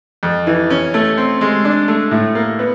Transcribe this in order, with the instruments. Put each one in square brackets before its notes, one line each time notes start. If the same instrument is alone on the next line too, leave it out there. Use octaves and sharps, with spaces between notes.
[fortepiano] F2
E3
C#4
A3
C4
G#3
D4
A3
A2
A#3
B3